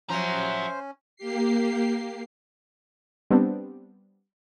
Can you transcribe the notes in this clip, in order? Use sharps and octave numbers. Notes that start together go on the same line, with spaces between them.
F3 F#3 C#4 C5 E5 A#5
A#3 G4 C7
G3 B3 C4 D4